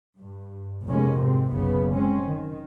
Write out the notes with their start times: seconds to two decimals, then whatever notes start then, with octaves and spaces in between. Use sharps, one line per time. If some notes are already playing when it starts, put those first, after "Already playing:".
0.18 G2
0.86 F1 B2 G#3 A#3 C#4
1.19 G#2 C3 C4
1.53 F#1 B1 C#3 B3
1.92 G#3 C4 C#4
2.22 D#3